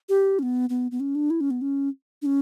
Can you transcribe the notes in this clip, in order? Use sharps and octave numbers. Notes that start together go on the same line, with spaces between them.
G4
C#4
B3
B3
B3
C#4
D4
E4
C#4
B3
C#4
D4
C#4